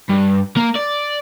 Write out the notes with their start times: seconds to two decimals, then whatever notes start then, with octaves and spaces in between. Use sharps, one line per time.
0.10 G2
0.57 A#3
0.76 D5